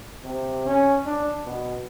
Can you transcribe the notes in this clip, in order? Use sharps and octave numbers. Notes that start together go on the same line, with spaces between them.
C3
C#4
D4
B2